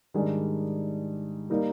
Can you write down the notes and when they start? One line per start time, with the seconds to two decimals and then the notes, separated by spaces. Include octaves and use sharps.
0.14 G#2 D#3 G3 D4 G#4
1.50 G3 A#3 D#4 A#4